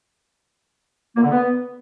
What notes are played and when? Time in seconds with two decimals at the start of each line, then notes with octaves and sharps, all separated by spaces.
1.16 A#3
1.23 D3
1.30 B3